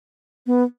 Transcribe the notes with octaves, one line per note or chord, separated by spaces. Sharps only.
B3